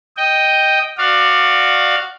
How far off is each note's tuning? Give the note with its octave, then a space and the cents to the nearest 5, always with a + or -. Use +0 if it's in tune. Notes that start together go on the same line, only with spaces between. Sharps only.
D#5 +0 G5 +0
F#4 +0 D5 +20 F5 +0